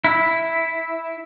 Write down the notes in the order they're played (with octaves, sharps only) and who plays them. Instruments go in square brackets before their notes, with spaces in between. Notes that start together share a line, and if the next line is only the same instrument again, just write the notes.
[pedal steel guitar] E4